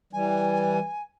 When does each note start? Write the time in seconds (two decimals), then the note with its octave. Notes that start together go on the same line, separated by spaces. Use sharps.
0.13 E3 G3 G#5